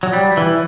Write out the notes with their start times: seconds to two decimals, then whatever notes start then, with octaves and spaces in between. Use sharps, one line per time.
0.03 F#3
0.13 G3
0.37 E3